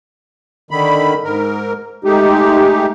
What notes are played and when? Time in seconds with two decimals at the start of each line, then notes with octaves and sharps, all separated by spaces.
0.71 D3 D#3 B5
1.24 G#2 A#4
2.04 G#3 A3 D#4 G4